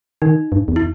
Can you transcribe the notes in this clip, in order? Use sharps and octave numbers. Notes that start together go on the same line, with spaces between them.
D#3 D#4
G2
E2
E4